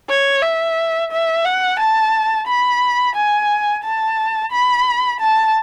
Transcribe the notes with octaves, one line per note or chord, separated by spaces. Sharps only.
C#5
E5
E5
F#5
A5
B5
G#5
A5
B5
A5